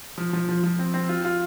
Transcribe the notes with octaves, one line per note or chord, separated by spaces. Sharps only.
F3
F3
F3
F3
C4
C4
F4
F4